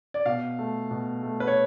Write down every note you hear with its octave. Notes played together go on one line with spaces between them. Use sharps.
D5
B2 F5
A3
B2
A3
B4
C#5